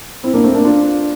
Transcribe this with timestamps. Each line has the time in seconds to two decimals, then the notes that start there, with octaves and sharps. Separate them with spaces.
0.24 C4 E4
0.34 A#3 D4
0.44 A3 C4
0.54 A#3 D4
0.64 D4 F4